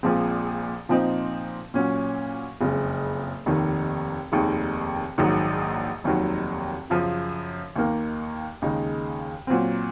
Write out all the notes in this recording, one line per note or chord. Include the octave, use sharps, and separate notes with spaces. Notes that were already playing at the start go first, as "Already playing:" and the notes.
A#1 A#2 F3 G#3 C4
A#2 F3 C4 D#4
A#2 F#3 C#4
F#1 F2 C#3 G#3
F1 D#2 D#3
F1 D#2 D#3 G#3
A#1 G#2 D#3 F#3
F1 D#2 D#3 F#3
F#2 C#3 F3
D#2 D#3 A#3
D#2 C#3 G#3 D#4
A#2 F#3 C4